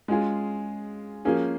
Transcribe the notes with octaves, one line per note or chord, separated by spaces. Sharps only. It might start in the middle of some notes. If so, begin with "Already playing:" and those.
G#3 C#4 F4 G#4
F3 A#3 C#4 G#4